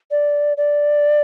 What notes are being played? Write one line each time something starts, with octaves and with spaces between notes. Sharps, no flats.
D5
D5